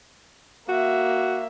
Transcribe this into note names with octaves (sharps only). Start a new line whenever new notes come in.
A#3 F#4 E5